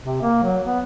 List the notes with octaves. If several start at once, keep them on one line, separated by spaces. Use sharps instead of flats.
C3
A#3
F#3
B3